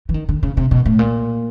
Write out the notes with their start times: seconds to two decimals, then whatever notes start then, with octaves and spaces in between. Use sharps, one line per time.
0.09 E3
0.14 D#3
0.29 D3
0.43 C#3
0.57 C3
0.71 B2
0.86 A2
0.99 A#2